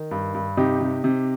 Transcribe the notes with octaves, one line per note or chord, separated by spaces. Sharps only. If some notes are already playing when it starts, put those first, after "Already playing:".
Already playing: D#3
G2
G2
C3 D#4 G4
C3
C3